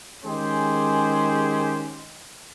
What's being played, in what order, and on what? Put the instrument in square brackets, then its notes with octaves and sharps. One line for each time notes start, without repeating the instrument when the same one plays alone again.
[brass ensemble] D#3 G#3 C#4 G4 G#4 C5